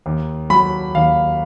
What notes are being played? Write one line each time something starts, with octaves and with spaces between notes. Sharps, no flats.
D#2
F#3 B5
D#2 F5